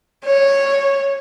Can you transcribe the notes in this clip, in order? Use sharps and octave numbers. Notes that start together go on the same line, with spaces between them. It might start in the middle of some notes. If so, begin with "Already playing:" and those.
C#5